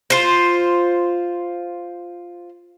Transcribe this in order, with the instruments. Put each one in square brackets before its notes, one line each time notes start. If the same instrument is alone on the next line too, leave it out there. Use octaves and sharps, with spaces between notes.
[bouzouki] F4 C5